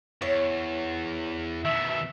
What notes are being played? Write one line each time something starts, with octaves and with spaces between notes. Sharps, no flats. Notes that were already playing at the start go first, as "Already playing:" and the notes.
E2 C#5
B2 D#3 E5